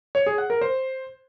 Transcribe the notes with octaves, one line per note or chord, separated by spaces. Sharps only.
C#5
G#4
F#5
A#4
C5